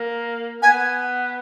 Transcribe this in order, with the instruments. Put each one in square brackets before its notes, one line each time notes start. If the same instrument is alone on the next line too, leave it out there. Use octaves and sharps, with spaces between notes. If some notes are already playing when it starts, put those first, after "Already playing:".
Already playing: [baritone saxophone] A#3
[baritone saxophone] B3 [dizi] G#5